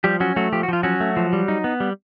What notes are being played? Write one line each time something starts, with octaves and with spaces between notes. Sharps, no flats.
F3 G3 G4
F#3 C#4 F#4
F#3 A3 F#4
F3 G4
F#4
F3 F4
F#3 C#4 F#4
A3
F3
G3
D#4
B3
G3